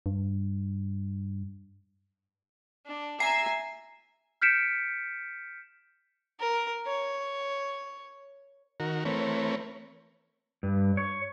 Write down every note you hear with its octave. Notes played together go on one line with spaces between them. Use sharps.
G2
D4
E5 G#5 A#5 E6 C7
F6 G6 B6 C#7 D7 E7
A#4
C#5
D#3 F#4 A#4
E3 A3 C4 A#4 B4 C#5
G2
C#5